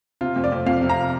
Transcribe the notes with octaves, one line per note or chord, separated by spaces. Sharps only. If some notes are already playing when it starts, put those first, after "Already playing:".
C3 F4
F2
D5
F2
F2 F5
C3
A#5